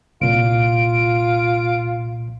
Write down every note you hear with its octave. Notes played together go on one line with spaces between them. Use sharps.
C2 A#2 F4 D7